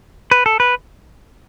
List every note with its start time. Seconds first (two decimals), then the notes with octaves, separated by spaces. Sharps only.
0.31 B4
0.46 A4
0.60 B4